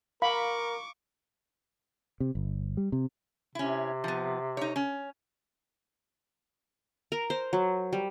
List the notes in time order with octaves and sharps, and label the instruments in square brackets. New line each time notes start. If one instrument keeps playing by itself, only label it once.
[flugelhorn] A#4 [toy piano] F5 A#5 [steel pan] B5 [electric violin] C#6 D6
[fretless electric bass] C3
G1
G3
C3
[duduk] C3 [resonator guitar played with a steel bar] C#4 E4
[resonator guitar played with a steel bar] F3 B3
D#4 C#5
C#4
[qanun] A#4
C5
F#3
G3